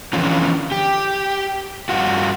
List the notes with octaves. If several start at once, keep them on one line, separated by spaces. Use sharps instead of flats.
D3 E3 F3 C#4 F4
G4
G2 F4 F#4